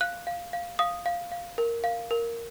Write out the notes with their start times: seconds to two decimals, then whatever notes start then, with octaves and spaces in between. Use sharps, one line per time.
0.01 F5 F#6
0.27 F5
0.53 F5
0.79 F5 D#6
1.06 F5
1.32 F5
1.58 A#4
1.84 F5
2.11 A#4